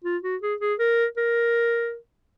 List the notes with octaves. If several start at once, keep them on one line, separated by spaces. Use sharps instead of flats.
F4
F#4
G#4
G#4
A#4
A#4